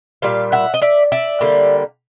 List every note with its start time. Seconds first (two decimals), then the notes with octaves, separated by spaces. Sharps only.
0.22 A#2 G3 F5
0.52 E5 F#5
0.74 D#5
0.82 D5 E5
1.12 D5 E5
1.41 D3 G3 A#3